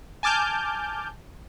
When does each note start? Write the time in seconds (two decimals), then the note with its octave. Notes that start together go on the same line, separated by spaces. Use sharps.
0.23 G#5 A5 D6 F6 G6